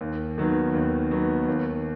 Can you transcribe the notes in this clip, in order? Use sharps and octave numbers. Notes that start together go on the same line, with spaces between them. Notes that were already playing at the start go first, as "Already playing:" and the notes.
D#2
D#3 F#3 B3
D#2
D#3 F#3 B3
D#2